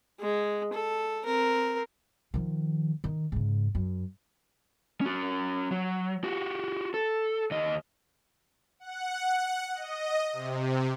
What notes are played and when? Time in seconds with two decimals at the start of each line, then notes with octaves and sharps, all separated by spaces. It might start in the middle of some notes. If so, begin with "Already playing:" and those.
0.20 G#3
0.73 A4
1.25 C4 A#4
2.34 D#3 F3
3.04 D#3
3.32 G#2 C#3
3.75 F#2
5.01 C#4 F#4
5.71 F#3
6.24 F#4 G4
6.94 A4
7.51 D#2 D#5
8.80 F#5
9.74 D#5
10.33 C3